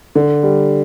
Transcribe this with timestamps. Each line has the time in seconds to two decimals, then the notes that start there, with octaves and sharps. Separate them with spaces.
0.15 D3
0.43 G3